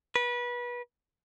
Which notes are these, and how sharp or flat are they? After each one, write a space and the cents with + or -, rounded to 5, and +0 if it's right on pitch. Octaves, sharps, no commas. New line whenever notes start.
B4 -25